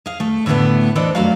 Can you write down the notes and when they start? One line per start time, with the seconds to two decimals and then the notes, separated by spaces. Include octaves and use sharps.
0.06 G#4 F5
0.20 A3
0.46 A2 D3 E3 G#3 A3 B3
0.95 E3 D4 A4 C5 D5 D#5
1.15 F#2 F#3 A3 F#4 D5 F5